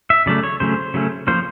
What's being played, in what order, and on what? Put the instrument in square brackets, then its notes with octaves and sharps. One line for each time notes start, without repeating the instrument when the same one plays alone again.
[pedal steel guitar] E5
C#3 F#3 A3 C#4 D5
C#5
C#3 F#3 A3 C#4 C5
C#3 F#3 A3 C#4
F3 A#3 C#4 C5